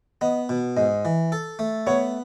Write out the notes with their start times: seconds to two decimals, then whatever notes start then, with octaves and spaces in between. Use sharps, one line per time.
0.21 B3 D#5
0.49 B2
0.76 G#2 D#5
1.05 E3
1.32 A4
1.59 A3
1.87 B3 C#5